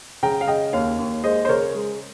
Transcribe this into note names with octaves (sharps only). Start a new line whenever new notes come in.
C#3 G5 A#5
F5
C#3 D#5 G5
D#2 C#5 F5
D#2
G#3 C5 D#5
C5
C#3 A#4 C#5
G#3